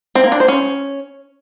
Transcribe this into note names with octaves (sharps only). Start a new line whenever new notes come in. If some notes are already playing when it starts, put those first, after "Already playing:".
C4
A#3
D4
C5
C#4